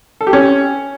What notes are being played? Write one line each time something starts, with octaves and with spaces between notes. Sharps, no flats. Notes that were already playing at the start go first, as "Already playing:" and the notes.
A4
G4
C#4